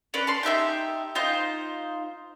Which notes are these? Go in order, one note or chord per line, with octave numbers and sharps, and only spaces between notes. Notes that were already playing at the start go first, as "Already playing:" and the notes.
C#4 D4 B4 D5
A5 C6
D#4 G4 E5 G6
D#4 F4 C5